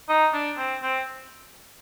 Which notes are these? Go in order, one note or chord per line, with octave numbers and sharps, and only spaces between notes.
D#4
D4
C4
C4